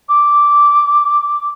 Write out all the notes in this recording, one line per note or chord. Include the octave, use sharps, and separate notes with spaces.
D6